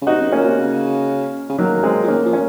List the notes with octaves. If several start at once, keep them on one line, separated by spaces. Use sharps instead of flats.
C#3
C3 D#4 F#4
F#2
G#2 A#3 C#4
A#2
C3
C#3
C#3
D#3 F#3 A#3
A#3
G#3 C4
F3
D#3 A#3 C#4
F3
A#3 C#4